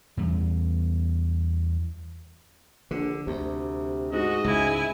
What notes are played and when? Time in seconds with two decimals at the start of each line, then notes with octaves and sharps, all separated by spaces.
0.17 E2 G3
2.91 A#1 D3
3.27 D2 C3
4.13 G#2 F#4 D#5
4.44 C#2 E4 G#5